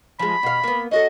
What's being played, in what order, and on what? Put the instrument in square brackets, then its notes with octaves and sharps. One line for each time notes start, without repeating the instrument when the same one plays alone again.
[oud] F3 G#3 [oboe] B5
[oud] B2 F5
A#3 B3
[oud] C#4 F#4 A4 [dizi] D#5